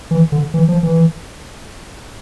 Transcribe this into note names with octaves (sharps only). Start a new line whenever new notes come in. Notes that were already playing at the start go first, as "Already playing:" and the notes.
E3
D3
E3
F3
E3